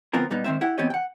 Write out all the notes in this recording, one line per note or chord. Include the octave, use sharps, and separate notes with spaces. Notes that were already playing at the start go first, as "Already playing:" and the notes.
D2 F3 B3 C4 F4 A#4
A#2 G3 B3 D#4
G#2 D#3 B3 C4 C5 E5
E4 G4 F#5
E3 B3 C4 G4 C#5 D#5
F#5 G5